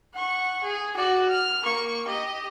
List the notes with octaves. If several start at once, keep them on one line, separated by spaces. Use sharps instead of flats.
F#5 C#6
G#4
F#4 D5
F6
A#3 C#6
G4 D#5